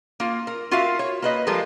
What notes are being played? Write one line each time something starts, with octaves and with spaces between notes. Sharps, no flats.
A#3 F4
A#4
F4 F#4 A#4 E5 F5
C#5
A#3 B4 D#5
F3 G3 G#3 F4 A4 A#4